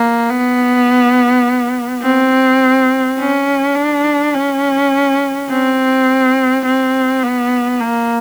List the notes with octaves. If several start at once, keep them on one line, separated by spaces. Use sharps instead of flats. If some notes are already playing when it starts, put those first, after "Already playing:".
Already playing: A#3
B3
C4
C#4
D4
C#4
C4
C4
B3
A#3